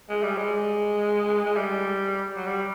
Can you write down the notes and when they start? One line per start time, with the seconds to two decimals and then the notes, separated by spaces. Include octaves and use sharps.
0.09 G#3
0.23 G3
0.38 G#3
1.45 G#3
1.56 G3
2.37 F#3
2.47 G3